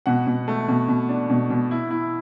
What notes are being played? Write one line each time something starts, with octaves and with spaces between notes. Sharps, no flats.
B2 F#5
B2
A3
B2
B2
D4
B2
B2
E4
E4